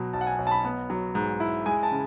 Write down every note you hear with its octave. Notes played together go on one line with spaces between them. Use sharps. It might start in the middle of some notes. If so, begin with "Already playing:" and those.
Already playing: B2 F#3
B1 A5
F#5
G#5
B1
A5
B5
B3
F#3
G#2
E4
G#3 G#5
A5
C#3